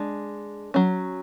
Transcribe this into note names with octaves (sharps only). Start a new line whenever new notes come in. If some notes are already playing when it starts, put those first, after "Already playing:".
Already playing: G#3 D4
F#3 C#4